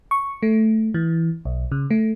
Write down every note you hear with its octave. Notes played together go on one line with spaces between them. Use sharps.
C#6
A3
E3
B1
C#3
A3